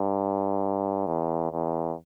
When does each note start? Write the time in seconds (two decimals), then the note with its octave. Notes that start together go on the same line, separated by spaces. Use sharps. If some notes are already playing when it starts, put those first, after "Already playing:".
Already playing: G2
1.07 E2
1.52 E2